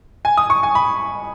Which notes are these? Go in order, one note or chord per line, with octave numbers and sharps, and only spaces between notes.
G#5
D#6
C#6
G#5
B5